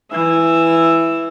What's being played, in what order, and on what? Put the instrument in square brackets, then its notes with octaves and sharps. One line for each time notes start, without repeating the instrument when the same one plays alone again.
[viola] E3 E5